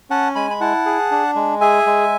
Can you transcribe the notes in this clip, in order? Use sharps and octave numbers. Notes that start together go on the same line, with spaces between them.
C#4 F#5 A5
G#3 G#5 B5
B5
E4 F#5 A5
G#4
D4
G#3
G#4 E5 G#5
G#3